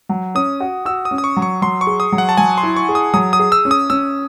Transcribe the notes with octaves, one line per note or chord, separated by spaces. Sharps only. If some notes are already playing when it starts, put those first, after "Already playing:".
F#3
C#4 D#6
F#4
F#4 E6
D#6
C#4
D#6
C#6
F#3
C#6
F#3 C6
C#6
G#4
D#6
F#3
F#5
A5
F#3 G#5
C6
E4
C#6
G#4
D#6
F#3 D#6
D#6
G#4
E6
C#4
D#6
C#4 E6